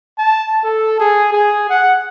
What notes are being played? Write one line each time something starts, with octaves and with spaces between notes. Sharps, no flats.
A5
A4
G#4
G#4
F#5